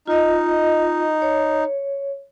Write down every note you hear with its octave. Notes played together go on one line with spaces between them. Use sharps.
D#4 F4 D#5
C#5